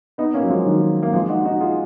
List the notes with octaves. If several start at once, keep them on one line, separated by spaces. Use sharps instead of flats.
B3 D#4
A#3 C#4
F#3
F3 G#3
D#3 F#3
A#3
F3 G#3
D#4 F#4
D#4 F#4
F4 G#4